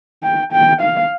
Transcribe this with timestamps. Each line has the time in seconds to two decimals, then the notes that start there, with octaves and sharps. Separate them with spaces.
0.23 G5
0.53 G5
0.81 F5